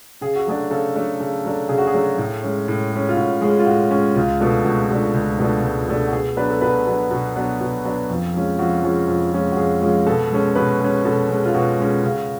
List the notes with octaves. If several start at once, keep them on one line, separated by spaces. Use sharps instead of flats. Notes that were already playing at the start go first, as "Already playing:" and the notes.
C#3 G#4
F#4
F#3 A3 D4 G#4
C#3 A4
F#3 A3 D4
C#3
F#3 A3 D4
C#3 G#4
F#4
G#4
F#3 A3 D4
A2
G#3 C#4
A2
G#3 C#4
F4
A2 F#4
G#3 C#4 G#4
F4
A2 F#4
G#3 C#4
C#2 F4
B2 A3 D4
C#2 F#4
B2 A3 D4
C#2
B2 A3 D4
C#2
B2 A3 D4
F#4
B2 G#4
F#3 B3 D4 B4
A4
B2 B4
F#3 B3 D4
B2
F#3 B3 D4
B2
F#3 B3 D4
F2
F3 G#3 C#4
F2 F#4
F3 G#3 C#4
F2
F3 G#3 C#4
F#4
F2 G#4
F3 G#3 C#4
B2 A4
G#3 C#4
B2 B4
G#3 C#4
B2 A4
G#3 C#4
F4
B2 F#4
G#3 C#4
C#3